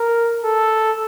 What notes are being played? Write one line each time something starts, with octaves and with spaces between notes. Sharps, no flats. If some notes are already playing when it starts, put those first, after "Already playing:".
Already playing: A#4
A4